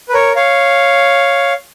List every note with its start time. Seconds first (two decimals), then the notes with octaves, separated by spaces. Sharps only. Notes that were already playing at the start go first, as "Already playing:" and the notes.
0.09 B4
0.13 A#4 C#5
0.36 C#5 F5